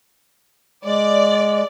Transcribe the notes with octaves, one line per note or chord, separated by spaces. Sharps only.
G#3 D5